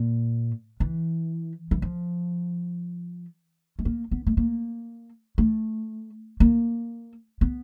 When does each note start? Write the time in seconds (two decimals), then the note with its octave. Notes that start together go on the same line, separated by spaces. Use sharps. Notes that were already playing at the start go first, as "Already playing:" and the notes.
Already playing: A#2
0.80 E3
1.71 E3
1.82 F3
3.79 A3
3.85 A#3
4.11 B3
4.27 A3
4.37 A#3
5.38 A3
6.40 A#3
7.41 B3